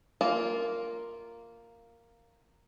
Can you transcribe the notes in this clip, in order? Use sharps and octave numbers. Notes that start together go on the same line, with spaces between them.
A#3 F4